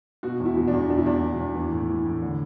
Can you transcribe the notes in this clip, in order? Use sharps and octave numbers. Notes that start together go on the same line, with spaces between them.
B2 F#4
E2
E4
B2
D4
E2
B2 D4
E4
E2 D4
B2
E2
E3
A2
E3
A2
D3